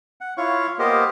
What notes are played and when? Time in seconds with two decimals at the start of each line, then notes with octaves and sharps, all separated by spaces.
0.21 F#5
0.37 E4 F4 C#5 F5 C#6
0.79 A#3 B3 G4 A#4 C5 D#5